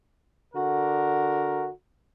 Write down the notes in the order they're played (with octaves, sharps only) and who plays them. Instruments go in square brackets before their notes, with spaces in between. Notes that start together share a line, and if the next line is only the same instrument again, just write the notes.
[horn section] D3 F#4 A#4